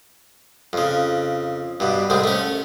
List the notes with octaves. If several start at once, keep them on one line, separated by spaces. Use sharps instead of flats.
F2 C#3
G2 B2
C2 A2 G#3 C4
A3 C#4